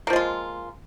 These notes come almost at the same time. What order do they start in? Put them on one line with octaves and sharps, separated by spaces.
A#3 F3 G#3 F4